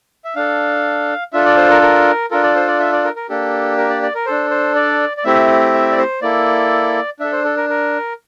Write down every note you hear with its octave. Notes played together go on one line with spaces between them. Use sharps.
E5
D4 A4 F5
D4 F4 A4 E5
D5
C5
A#4
A#4
D4 F4 A4 A#4
D5
C5
D5
E5
D5
A#4
A#4
A#3 D4 G4 A4
A#4
D5
D5
A#4
D4 A4 C5
C5
D5
D5
A3 C4 E4 G4 E5
E5
D5
C5
A#3 E4 A4 D5
D4 A4 E5
C5
A4
A#4
A#4